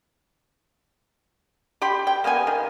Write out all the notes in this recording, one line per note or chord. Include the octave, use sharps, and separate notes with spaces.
G4 G5 B5 C6
G5
A#3 B3 G4 G#5
D#3